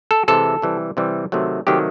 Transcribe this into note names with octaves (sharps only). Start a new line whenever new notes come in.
A4
C3 E3 G#3 A4
C3 E3 G3
C3 E3 G3
C3 D#3 F#3 A3
C3 D#3 F#3 A3 G4